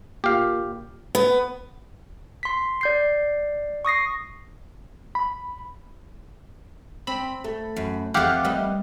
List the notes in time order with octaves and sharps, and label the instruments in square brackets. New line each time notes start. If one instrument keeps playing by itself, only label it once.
[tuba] A#2 [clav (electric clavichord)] G4 F5
[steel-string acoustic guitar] B3
[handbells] C6 B6
D5 G6 C7
C#6 D#6 A#6 C7
[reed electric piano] B5
[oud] C4 [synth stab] B5
[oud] A3
[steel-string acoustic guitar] F#2
[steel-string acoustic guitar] F2 A3 [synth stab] G4 F5 F#5
[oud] G3 B4 D#5